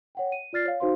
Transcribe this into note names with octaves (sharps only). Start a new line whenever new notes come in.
C#5 F#5 G5
D#7
F4 D5 F6 A6 C7
C#5 F5
D#4 F#4 C5 F5 C6